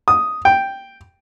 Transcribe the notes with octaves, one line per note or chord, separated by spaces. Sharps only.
D#6
G5